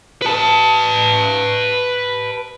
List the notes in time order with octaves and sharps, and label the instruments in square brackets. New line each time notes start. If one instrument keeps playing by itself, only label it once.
[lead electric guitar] B4 A5